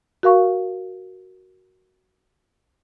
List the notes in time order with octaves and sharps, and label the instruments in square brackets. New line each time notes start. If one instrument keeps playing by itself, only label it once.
[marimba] F#4 A#4 F5 C#6